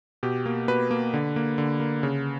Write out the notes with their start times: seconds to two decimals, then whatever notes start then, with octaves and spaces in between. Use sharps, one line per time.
0.23 B2 G4
0.46 A#3
0.68 B2 B4
0.91 A#3
1.14 D3
1.36 A#3
1.58 D3
1.80 A#3
2.03 C#3